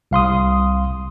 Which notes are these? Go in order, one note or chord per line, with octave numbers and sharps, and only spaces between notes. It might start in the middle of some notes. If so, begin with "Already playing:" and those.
C2 F5 C6 D#6